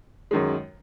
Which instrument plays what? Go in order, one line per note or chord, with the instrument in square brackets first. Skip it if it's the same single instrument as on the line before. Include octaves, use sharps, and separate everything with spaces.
[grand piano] F#2 D#3 G#3